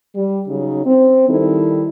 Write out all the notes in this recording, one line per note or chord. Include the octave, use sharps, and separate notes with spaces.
G3
C#3 F#3 D#4
C4
D#3 G3 D#4 E4 A4